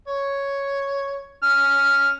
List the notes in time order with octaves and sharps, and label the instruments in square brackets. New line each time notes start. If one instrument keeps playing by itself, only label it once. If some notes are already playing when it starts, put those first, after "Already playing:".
[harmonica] C#5
C#4 F6